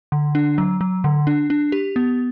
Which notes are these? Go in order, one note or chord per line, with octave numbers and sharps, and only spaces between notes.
D3
D4
F#3
F#3
D3
D4
D4
G4
B3